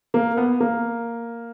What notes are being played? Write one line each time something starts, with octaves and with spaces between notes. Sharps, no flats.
A#3
B3
A#3